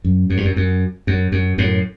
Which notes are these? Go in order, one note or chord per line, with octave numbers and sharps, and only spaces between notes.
F#2
F#2
G2
F#2
F#2
F#2
F#2
F#2 A2